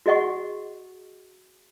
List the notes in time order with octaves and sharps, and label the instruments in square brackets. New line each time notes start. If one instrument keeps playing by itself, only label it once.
[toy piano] F#4 G#4 D#5 F#5 C#6